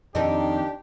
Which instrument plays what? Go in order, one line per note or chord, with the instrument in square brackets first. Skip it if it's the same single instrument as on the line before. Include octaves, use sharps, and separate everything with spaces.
[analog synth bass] F2 [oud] D#3 C4 D#4 [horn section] D4 G4